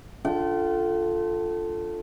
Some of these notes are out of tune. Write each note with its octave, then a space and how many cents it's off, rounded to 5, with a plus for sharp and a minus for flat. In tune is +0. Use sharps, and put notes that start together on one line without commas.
D3 +0 F4 +0 G5 -45